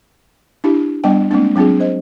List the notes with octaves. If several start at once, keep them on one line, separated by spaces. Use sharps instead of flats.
D4 E4 G4
G3 B3 D4 D#5 G5
G#3 A#3 C4 D4
F#3 C4 D4 F4 G#4
C5 D#5